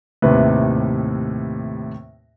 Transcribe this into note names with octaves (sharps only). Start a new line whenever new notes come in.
D#2 A2 C3 B4